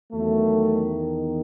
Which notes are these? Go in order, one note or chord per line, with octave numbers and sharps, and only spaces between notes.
E2 D#3 F#3 A3